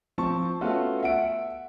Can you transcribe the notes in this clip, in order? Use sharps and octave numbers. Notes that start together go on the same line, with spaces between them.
F3 C4 A5 C#6
A3 B3 C#4 F4 F#4
E5 F#5 D7